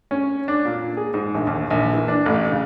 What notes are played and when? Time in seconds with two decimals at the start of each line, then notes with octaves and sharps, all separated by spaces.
0.11 C#4
0.48 D4
0.65 A#2
0.97 G#4
1.14 G#2
1.35 A#1
1.47 D#2
1.70 A#1
1.94 E3
2.08 D4
2.26 A1
2.52 C#3